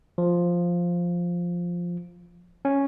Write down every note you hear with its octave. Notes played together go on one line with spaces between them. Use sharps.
F3
C#4